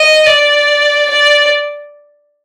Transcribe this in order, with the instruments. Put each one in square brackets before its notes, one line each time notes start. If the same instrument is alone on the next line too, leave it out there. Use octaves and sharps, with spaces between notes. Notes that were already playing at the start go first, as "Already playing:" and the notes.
Already playing: [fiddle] D#5
D5
D5